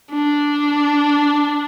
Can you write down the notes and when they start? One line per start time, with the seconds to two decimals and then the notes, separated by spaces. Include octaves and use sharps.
0.11 D4